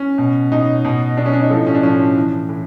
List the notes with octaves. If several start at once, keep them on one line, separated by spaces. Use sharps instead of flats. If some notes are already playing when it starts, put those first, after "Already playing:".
Already playing: C#4
B2
B2 D#4
B2
B2 D4
C#4
D4
D#4
A2 F3 A4
D#4
C#4
D4
A2 F3 C#4
A2 E3
A2 E3